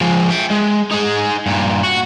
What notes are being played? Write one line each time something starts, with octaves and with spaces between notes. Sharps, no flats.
F3 G#3
E5 G5
G#3
D#4 G#4
G2 A#2
F#4